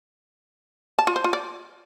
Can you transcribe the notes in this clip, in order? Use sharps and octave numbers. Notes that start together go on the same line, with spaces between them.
A5
F4
C5
F4
D5